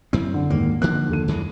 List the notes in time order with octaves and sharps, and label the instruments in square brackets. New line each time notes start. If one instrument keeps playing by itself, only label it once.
[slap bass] F#2 C4 [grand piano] E4
[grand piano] D3
[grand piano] D#2 G#2 [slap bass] A#3
[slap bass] D3 F3 A#3 [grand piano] F#6
[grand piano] D#2 A4 D#7
[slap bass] F#2 E3 G#3